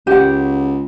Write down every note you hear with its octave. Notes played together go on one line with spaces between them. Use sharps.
C#2 G4 F#5